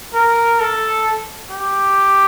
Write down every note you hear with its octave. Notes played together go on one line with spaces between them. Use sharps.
A#4
A4
G4